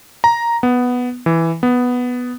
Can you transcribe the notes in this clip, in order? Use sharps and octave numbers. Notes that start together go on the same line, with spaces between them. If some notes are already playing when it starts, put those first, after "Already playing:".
A#5
B3
E3
B3